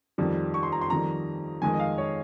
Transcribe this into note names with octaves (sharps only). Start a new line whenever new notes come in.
F2 D#3 G3
C#6
C6
A#5
C6
F2 D#3 G3 A#5
F2 D#3 G#3 G#5
D#5
F5
C#5